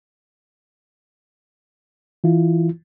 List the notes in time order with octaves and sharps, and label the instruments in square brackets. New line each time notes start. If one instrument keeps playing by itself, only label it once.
[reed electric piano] E3 E4 F4